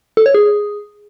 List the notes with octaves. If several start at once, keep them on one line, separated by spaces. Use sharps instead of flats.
A4
C#5
G#4